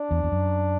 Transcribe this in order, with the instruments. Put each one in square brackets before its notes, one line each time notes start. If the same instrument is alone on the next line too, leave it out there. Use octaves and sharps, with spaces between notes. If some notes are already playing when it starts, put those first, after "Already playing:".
Already playing: [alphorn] D4
[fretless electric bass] E2
E2
F#2